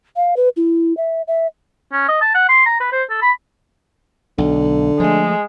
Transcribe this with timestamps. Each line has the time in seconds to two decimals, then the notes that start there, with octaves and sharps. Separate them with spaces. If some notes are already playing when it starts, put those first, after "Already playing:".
0.16 F5
0.36 B4
0.57 E4
0.97 E5
1.27 E5
1.92 C#4
2.09 D#5
2.21 A5
2.34 F#5
2.49 C6
2.66 A#5
2.80 B4
2.92 C5
3.10 A4
3.22 B5
4.38 B1 D3
5.00 F3 G#3 A3